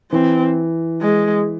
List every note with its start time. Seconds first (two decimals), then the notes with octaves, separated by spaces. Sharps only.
0.12 E3 C4
1.01 G#3